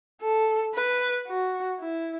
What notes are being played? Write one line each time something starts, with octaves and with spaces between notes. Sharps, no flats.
A4
B4
F#4
E4